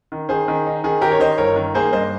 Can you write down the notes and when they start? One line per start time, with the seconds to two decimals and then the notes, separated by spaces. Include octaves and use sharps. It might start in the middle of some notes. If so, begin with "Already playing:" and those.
0.12 D#3
0.29 D#3 G#4 C5
0.48 D#3
0.66 D#4
0.84 D#3 G#4
1.01 D#3 G4 A#4
1.12 C#5
1.20 D#3 C5 D#5
1.38 G1 A#4 C#5
1.56 D#3
1.74 A#3 G#4 C5
1.93 G2 C5 D#5